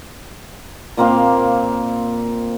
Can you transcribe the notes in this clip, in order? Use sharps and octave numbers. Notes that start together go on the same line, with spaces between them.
A#2 A#3 C4 F5